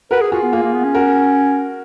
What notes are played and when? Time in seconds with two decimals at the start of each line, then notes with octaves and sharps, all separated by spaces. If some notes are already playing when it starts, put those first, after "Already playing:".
0.11 F#4 A#4 B4
0.21 G#4
0.32 F4 F#4 G#4
0.42 B3
0.53 A#3 F4 G#4
0.63 A#3
0.73 B3
0.84 C#4
0.95 F#4 A#4